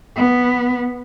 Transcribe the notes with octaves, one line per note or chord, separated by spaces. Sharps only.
B3